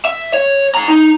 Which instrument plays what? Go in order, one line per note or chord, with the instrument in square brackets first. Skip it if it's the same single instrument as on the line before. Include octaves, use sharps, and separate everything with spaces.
[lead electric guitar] E5
C#5
G#2 A#5
D#4